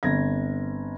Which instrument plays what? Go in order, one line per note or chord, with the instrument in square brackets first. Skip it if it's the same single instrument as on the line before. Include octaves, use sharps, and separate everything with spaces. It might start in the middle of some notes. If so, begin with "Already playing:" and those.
[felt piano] G1 C4 G#6 A#6